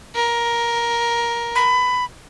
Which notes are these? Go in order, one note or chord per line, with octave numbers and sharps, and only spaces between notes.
A#4
B5